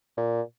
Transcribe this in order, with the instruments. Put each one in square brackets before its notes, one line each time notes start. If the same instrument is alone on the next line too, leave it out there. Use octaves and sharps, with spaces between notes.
[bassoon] A#2